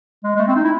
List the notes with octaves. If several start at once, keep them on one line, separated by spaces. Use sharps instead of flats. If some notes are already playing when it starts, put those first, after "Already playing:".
G#3
G#3
A3
C4
D#4
E4